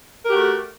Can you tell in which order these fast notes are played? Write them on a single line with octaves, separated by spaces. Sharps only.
A#4 G4 F#4 A3